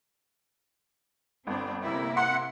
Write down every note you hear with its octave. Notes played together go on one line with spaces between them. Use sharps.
G1 C4 D4
C3 A#3 E4
F#5 C6